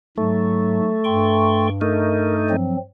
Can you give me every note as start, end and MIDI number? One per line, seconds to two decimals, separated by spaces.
0.18 0.80 44
0.18 0.98 54
0.18 1.70 57
1.04 2.88 43
1.04 1.67 79
1.04 1.67 84
1.04 1.67 85
1.81 2.56 57
1.81 2.56 63
1.81 2.34 70
2.50 2.77 53
2.50 2.77 54
2.50 2.77 60